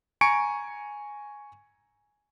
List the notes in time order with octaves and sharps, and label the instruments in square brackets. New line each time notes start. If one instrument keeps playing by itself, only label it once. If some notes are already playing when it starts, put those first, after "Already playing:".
[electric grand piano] G#5 A#5 C#6 C#7 D7